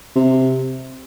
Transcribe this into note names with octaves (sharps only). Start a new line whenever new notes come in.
C3